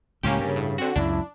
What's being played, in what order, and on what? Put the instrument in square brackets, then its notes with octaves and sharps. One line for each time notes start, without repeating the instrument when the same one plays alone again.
[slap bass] C#2 A2 [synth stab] A#3 C#4 G4
[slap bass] G2 [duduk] C#3
[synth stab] A2
[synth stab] D3 F#4 [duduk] C4
[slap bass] C#2 F#2 F#3 [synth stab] D4 [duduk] E4